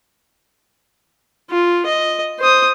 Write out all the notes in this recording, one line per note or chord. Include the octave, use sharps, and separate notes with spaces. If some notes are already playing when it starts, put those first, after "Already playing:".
F4
D#5
C5 D#6